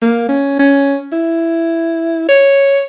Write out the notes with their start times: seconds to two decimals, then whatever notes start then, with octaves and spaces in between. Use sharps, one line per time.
0.02 A#3
0.28 C#4
0.59 C#4
1.12 E4
2.28 C#5